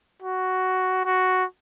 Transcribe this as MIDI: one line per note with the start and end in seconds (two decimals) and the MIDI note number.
0.22 1.04 66
1.05 1.44 66